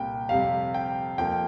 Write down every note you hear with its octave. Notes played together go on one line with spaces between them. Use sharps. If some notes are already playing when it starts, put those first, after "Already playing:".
Already playing: C2 A#2 A#3 G5
F2 C3 G3 F5
G5
F2 F3 A#3 G5